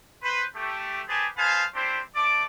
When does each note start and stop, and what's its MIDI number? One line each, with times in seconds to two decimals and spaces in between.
0.23 0.43 71
0.23 0.43 72
0.55 1.02 57
0.55 1.02 67
1.08 1.27 67
1.08 1.27 68
1.08 1.27 71
1.08 1.27 72
1.08 1.27 80
1.08 1.27 81
1.37 1.65 68
1.37 1.65 71
1.37 1.65 72
1.37 1.65 77
1.37 1.65 80
1.37 1.65 81
1.75 2.00 60
1.75 2.00 62
1.75 2.00 64
1.75 2.00 67
1.75 2.00 72
2.15 2.44 57
2.15 2.44 74
2.15 2.44 81
2.15 2.44 86